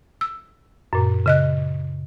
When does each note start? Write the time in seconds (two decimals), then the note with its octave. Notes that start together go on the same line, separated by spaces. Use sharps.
0.21 E6
0.93 F#2 A#2
1.26 C#3 D#5 F#6